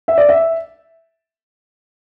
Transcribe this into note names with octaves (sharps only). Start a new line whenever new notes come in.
E5
D5
E5